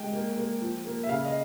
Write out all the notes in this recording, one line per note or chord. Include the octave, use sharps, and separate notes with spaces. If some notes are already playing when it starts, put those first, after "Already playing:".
Already playing: G#3 G5
A#3
A#3
F3
A#3
E5
C#3 F5
D#5